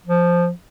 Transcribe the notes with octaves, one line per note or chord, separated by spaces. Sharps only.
F3